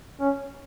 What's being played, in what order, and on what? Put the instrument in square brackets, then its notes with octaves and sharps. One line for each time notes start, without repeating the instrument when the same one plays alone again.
[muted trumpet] C#4